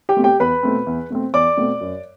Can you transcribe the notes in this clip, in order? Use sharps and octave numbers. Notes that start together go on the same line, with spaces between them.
G4 G5
B2 A3 C4
G4 G5
E2 B4 B5
B2 A3 C4
E2
B2 A3 C4
E2 D5 D6
B2 A3 C4
F#2